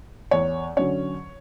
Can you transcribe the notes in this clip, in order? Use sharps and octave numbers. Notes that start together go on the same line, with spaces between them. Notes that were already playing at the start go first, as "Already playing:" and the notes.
E2 C#5
D3 F#3 C#4 C#5